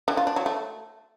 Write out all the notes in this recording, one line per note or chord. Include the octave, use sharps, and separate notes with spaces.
D3
F4
D4
F#3
A3